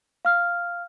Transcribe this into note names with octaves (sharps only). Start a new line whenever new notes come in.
F5 F6